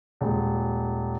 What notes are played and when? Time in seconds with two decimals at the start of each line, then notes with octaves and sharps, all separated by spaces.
0.21 D#1 G#3